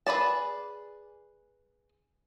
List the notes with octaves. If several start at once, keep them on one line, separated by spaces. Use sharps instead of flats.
G#4 B4 D5 A5